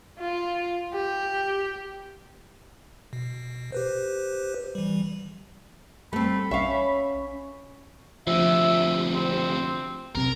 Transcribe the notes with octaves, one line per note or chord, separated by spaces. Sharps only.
F4
G4
B2
G4 B4 C5
E3 G3
G3 A3 C4 B5
B1 C#4 E5 F5 C#6
D2 C3 F3 E5
C4
B1 C3 A#4